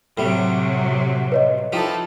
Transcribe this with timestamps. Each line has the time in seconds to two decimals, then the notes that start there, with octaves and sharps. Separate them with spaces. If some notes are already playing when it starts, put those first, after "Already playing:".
0.18 A2 C3 F#3 G3
1.32 B4 C#5 D#5
1.73 F3 D#4 E4 G4 A4